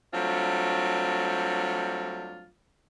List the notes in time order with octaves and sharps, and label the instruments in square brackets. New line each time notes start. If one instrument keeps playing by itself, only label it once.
[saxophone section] F#3 G3 A3 C4 D4 F4